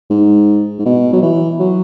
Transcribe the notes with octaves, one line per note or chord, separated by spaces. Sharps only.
G#2
G#2
B2
F#3
E3
F#3